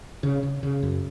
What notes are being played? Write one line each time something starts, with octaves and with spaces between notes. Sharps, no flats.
C#3
C#3
C#3
F#2